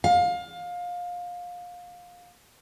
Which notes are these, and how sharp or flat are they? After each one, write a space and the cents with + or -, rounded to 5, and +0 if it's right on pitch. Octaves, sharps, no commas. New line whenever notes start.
F5 +25